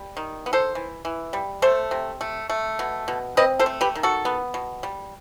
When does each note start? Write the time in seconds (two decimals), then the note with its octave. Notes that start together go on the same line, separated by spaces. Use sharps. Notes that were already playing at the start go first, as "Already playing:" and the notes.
Already playing: G3
0.17 D#3
0.46 B3
0.53 A4 C5
0.75 E3
1.05 E3
1.33 G3
1.62 A3 A4 C5
1.91 C3
2.21 A3
2.49 A3
2.79 B2
3.08 B2
3.37 C4 B4 D#5
3.59 A4 C5
3.66 A3
3.81 G4 B4
3.95 D#3
4.03 F#4 A4
4.25 B3
4.54 B2
4.83 G3